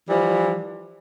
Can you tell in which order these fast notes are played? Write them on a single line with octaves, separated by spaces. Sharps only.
E3 G3 F3